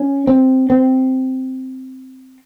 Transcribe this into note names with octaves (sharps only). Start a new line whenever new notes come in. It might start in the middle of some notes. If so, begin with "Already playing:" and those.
Already playing: C#4
C4
C4